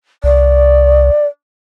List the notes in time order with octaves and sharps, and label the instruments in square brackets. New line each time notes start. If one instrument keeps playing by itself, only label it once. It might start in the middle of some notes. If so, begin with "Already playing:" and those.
[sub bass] C2 [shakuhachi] D5